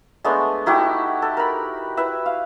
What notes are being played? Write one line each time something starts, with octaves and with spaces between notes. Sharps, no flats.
G#3 A3 B3 D4
D#4 E4 F#4 G4
A4
A#4 B5
E4 B4 E5
F5